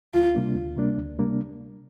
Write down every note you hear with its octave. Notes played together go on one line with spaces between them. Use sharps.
D2 F4
C3 G3 A#3 D4
D2
C3 G3 A#3 D4
D2
C3 G3 A#3 D4